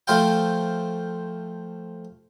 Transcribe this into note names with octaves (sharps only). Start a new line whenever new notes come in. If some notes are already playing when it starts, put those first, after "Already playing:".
F3 A3 C5 F5 G5